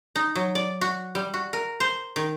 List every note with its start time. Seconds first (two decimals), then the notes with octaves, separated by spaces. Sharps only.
0.16 D#4
0.35 F#3
0.55 D5
0.81 F#4
1.15 G3
1.34 F#4
1.53 A#4
1.80 C5
2.16 D#3